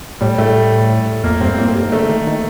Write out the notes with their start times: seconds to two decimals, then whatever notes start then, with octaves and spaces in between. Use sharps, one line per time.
0.21 A2 G3
0.38 A2 A3
1.24 F2 A#3
1.41 G2 C4
1.58 A2 A#3
1.67 A#2
1.75 G3
1.84 D#3
1.92 D3 A3
2.09 D#3
2.27 D#3